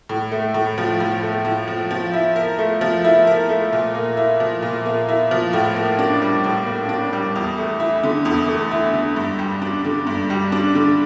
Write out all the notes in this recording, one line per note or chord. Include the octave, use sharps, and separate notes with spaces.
A2
A3
A2
F3
A2
A3
A2
F3
F3
E4
A#4
A3
F3
E4
A#4
A3
A#2
A#3
E4
F3
A#2
A#3
E4
F3
A2
A#3
D4
G3
A2
A#3
D4
G3
E2
A3
E4
D3
E2
A3
E4
D3
G2
G3
D4
D3
G2
G3
D4
D3